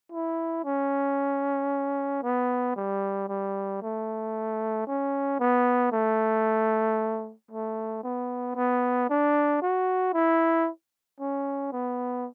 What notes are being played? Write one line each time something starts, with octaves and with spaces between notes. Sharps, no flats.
E4
C#4
B3
G3
G3
A3
C#4
B3
A3
A3
B3
B3
D4
F#4
E4
C#4
B3